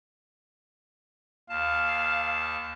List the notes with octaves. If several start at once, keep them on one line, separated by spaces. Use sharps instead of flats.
D#2 F5 A5